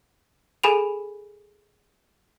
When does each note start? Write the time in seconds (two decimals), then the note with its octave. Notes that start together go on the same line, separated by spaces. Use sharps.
0.63 G#4 A4 G#5 B5 D#7 F7